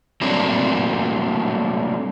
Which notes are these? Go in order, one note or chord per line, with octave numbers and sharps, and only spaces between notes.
F#3 G3 A3 A#3 C4 D4